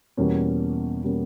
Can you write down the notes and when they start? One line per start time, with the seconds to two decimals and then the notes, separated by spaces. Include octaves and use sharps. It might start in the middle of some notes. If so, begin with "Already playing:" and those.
0.17 E2 B2 G3 A#3 C#4
1.04 B2 G3 A#3 C#4